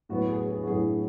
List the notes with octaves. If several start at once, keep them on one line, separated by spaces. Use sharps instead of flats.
A2 F#3 B3 F#4
G#4
G#4
F#4
A2 F#3 B3 G#4